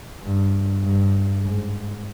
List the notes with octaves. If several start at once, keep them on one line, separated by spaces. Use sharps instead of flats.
G2
G2
G#2